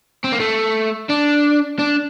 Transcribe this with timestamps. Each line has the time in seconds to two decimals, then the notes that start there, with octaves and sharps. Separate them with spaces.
0.24 C4
0.32 A#3
0.40 A3
1.09 D4
1.79 D4